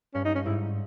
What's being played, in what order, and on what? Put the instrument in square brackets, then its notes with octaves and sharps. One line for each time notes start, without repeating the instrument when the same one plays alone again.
[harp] G2 [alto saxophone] C#4
[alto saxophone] D#4
C#4
[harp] G#2 [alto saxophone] E4